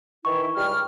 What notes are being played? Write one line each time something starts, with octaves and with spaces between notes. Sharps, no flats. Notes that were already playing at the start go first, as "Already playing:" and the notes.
D#3 E3 E4 C#6
C#2 G3 F6